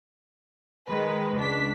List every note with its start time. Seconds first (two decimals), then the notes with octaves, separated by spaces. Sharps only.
0.88 D#3 G#3 B4
1.36 C#2 D4 B6